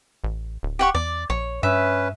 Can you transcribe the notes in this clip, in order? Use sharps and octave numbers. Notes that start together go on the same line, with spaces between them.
A1
D1
G4 F#5 C#6
E2 D5
A#1 C#5
G2 C#4 B4 E5